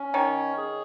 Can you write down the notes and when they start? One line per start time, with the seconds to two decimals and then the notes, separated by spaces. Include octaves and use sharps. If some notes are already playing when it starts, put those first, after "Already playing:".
Already playing: C#4
0.14 D#3 C#5
0.58 G#4